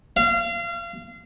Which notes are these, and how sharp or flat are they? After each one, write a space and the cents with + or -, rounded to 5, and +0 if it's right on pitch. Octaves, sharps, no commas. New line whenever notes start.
F5 -30